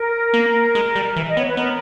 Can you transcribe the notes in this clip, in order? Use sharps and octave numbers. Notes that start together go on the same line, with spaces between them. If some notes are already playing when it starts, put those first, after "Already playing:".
Already playing: A#4
A#3
G#3
G3
E3 E5
D#5
B3 C#5
B4
B3 A#4